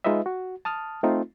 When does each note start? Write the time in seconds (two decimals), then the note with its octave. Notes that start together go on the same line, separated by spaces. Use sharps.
0.04 G#3 D#4 F4 B4 D#5 E5
0.26 F#4
0.65 A5 D#6 F6
1.03 A3 C4 D#4 F4